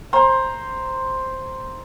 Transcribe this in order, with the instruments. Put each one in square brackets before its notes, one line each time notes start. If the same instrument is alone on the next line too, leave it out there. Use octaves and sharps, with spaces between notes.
[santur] C5 A#5